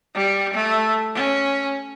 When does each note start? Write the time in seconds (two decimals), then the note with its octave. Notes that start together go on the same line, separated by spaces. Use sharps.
0.15 G3
0.54 A3
1.15 C#4